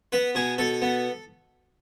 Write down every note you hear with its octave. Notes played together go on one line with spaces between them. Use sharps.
B3 B4
B2 G#4
B2 A4
B3